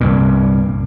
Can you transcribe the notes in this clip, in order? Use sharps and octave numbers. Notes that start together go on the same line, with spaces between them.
C2 G2 A#2